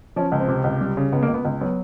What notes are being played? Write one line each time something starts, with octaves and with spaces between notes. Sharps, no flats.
F3 C#4
C#2
C4
C3
C#2
G3
C#3
C#2 B3
A#3
C#2
B3
C#2
F#3 B3